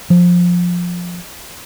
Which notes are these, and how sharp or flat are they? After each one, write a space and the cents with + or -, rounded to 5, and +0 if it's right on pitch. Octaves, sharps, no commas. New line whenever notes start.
F3 +15